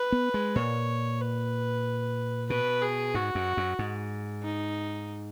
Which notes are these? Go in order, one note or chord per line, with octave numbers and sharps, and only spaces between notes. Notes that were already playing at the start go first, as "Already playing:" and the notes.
Already playing: B4
B3
G#3
A#2 C#5
B4
B2 B4
G#4
G#2 F#4
F#2
F#2
G#2
D#4